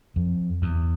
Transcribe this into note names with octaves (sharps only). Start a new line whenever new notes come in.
F2
E2